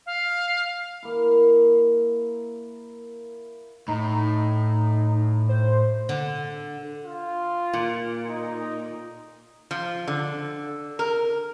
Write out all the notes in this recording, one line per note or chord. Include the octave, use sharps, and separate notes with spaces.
F5
A#3 E4
A2 D#4
C5
D3
F4
A#2
D#4
F3
D3
A#4